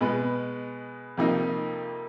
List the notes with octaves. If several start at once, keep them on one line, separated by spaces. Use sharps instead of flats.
B2 G#3 B3
F2 C3 F3 A#3 D#4